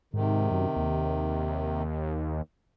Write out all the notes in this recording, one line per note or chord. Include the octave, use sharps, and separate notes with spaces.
G#2 C3 D#3
F#2
D#2